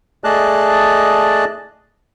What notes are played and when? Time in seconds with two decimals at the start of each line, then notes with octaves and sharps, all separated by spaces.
0.24 A3 G#4 D5 D#5 A5 F#6